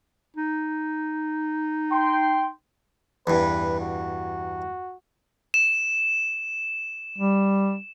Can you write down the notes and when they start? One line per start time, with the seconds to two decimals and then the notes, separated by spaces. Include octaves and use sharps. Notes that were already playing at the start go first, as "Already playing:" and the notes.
0.37 D#4
1.90 G5 C6
3.27 E2 G2 B4
3.80 F#4
5.54 E7
7.18 G3